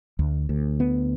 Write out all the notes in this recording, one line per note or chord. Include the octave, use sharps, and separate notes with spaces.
D2
D2
B3